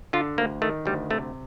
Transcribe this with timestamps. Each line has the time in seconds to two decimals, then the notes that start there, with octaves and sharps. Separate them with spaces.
0.13 D3 F4
0.38 D2 A#3
0.62 D#3 A3
0.85 D2 G3
1.10 C3 A3